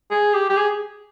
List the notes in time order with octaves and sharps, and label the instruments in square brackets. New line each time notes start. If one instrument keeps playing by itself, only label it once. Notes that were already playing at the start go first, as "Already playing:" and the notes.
[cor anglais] G#4
G4
G4
G#4